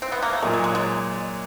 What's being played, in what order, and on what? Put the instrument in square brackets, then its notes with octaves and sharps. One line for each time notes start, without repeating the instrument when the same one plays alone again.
[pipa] C4
B3
A#3
A3
[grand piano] A#2 F#3 A#3 [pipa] G#3
[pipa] G#3
G#3
G#3